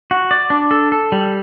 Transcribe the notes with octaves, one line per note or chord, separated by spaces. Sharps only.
F#4
D5
D4
A4
A4
G3